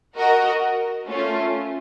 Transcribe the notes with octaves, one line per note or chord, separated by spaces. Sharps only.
F#4 A#4 D#5 F#5
A3 C#4 F4